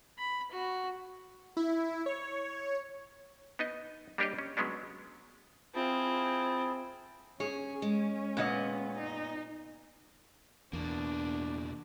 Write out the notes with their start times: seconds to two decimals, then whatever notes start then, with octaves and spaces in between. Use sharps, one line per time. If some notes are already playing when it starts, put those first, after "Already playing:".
0.18 B5
0.51 F#4
1.57 E4
2.06 C#5
3.59 B3 D#4 D#5
4.18 G3 A#3 D4 G4 C#5 D#5
4.39 C#4
4.57 F#3 G#3 B3 C#4 D4
5.75 C4 E4 F4 G#4 A5
7.40 C#4 G#4 C#5
7.82 G#3
8.37 A#2 B3 D#5
8.96 D#4
10.73 E2 B2 A#3 D4